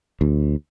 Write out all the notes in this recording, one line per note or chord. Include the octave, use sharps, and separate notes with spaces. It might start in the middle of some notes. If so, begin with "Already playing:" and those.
D2